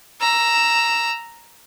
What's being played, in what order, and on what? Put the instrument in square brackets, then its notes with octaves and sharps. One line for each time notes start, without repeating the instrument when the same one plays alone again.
[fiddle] A#5 E6